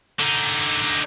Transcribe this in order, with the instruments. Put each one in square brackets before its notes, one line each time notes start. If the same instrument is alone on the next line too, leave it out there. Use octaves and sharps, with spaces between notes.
[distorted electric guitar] D3 D#4